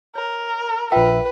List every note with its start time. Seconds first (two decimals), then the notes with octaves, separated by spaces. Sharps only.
0.15 A#4 C#5
0.92 A#1 F4 B4 E5 G5